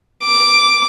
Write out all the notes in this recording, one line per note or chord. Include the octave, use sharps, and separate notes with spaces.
D6